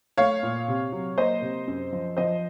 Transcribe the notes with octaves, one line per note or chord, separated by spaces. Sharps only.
A3 C#5 F5
A#2
C3
F#3
A#3 C5 D#5
C3
F#2
F3
F3 C5 D#5